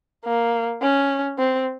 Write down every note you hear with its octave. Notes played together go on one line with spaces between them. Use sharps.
A#3
C#4
C4